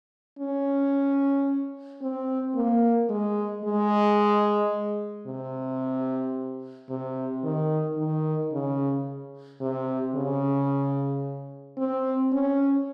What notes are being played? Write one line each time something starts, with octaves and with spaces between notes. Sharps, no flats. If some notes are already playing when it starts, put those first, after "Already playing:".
C#4
C4
A#3
G#3
G#3
C3
C3
D#3
D#3
C#3
C3
C#3
C4
C#4